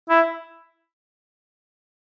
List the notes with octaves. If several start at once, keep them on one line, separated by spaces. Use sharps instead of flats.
E4